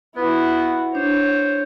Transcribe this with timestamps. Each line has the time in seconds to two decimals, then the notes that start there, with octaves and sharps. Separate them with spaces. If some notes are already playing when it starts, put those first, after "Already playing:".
0.16 B3 E4 F#4 B4
0.95 D4 C5 C#5